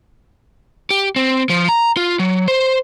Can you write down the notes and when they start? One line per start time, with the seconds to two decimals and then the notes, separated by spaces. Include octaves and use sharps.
0.90 G4
1.16 C4
1.50 F3
1.69 A#5
1.97 F4
2.19 F#3
2.48 C5